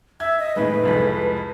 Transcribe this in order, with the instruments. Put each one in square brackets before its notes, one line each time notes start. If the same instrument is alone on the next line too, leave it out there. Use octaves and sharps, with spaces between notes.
[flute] E5 [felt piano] G#6
[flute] D#5
[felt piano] A2 D#3 G#3 [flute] B4
[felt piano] C2 F2 G#3